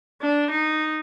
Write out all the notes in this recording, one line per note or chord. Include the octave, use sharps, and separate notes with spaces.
D4
D#4